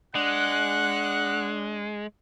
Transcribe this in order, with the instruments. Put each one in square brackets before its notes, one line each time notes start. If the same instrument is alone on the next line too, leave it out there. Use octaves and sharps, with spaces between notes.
[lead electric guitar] G#3 [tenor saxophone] D4 [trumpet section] F#5 [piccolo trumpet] F#6